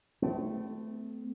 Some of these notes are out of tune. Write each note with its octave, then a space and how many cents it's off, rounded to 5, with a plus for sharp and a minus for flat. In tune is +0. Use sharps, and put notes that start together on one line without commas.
A3 -5 C4 -45